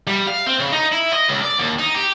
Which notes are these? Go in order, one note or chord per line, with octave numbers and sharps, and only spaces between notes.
G3
F5
C4
C#3
D#4
E4
D#5
C#2
D5
D#2
D#4
G4